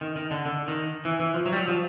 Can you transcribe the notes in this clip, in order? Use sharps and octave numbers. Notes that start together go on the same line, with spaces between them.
D#3
D#3
D3
D3
D#3
E3
E3
F3
F#3
G3
F#3
F3